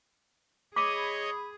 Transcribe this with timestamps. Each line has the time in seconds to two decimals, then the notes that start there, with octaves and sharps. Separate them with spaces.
0.76 G#4 C#5 D#5 B5 D6 D#6